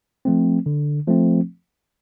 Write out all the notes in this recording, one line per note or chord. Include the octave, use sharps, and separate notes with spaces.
F3 A3 C4
D3
F3 A3 C4